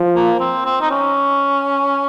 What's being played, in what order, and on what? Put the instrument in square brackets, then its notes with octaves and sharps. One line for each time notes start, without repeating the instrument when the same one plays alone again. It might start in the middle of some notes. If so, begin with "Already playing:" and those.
Already playing: [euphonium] F3
[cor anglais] A#3
C4
C4
D#4
C#4